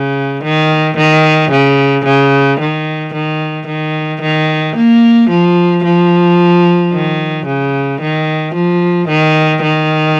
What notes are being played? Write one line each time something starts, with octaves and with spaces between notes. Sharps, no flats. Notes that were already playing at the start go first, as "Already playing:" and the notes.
Already playing: C#3
D#3
D#3
C#3
C#3
D#3
D#3
D#3
D#3
A#3
F3
F3
D#3
C#3
D#3
F3
D#3
D#3